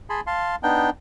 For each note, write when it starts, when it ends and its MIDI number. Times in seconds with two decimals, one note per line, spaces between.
0.10 0.21 68
0.10 0.21 80
0.10 0.21 81
0.10 0.21 83
0.10 0.21 84
0.27 0.56 77
0.27 0.56 81
0.27 0.56 84
0.63 0.90 59
0.63 0.90 62
0.63 0.90 63
0.63 0.90 79